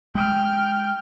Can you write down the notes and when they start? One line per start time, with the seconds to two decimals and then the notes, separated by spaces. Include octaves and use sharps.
0.15 G#3 G5 F6